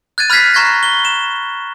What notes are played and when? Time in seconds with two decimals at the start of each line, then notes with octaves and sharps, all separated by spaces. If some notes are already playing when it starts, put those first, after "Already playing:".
0.18 F#6 G#6 A6 D#7
0.30 B5 F6 F#6 G#6 B6 C7
0.54 A#5 B5 C#6 F#6 G#6 A#6
0.83 G7
1.05 E7